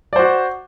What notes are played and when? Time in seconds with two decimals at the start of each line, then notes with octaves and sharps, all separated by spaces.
0.13 D5
0.16 C5
0.19 F#4